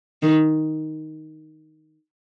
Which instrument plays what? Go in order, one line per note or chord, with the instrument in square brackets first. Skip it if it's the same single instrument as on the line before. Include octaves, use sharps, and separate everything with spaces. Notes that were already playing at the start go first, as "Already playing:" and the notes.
[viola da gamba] D#3